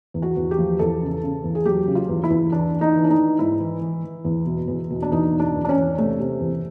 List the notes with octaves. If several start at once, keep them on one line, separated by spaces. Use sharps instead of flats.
E2
F#4
E2
G4
F3
E2 A4
C#3
C#3
E2
G#4
F#3 G4
C#3
F4
E2
E4
E2
E3 D4
E3
D#4
E3
D4
D#4
E3
G#2 E4
E3
E3
E3
E2
B2
E2
B2
D4
E2 D#4
B2
D4
E2
D4
C#4
E2
C3 A3
C3
E2